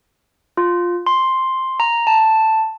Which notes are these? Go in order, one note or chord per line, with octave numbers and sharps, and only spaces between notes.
F4
C6
A#5
A5